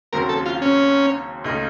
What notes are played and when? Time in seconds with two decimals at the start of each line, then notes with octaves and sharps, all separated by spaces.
0.13 D#2 C#3 F#3 C4 F#4 A#4
0.29 A4
0.46 F4
0.62 C#4
1.44 C#2 C#3 A3 D#4